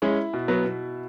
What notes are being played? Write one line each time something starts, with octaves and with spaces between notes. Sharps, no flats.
G#3 C#4 E4
B2
F#3 B3
B2